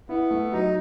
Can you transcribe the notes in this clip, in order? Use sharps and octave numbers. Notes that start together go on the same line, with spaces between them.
B3 E4
A3
F#3 D#4